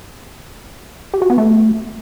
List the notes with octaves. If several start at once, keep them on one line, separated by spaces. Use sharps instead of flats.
G4
F#4
B3
A3